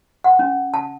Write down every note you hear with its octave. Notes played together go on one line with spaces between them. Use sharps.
F#5
C#4
A5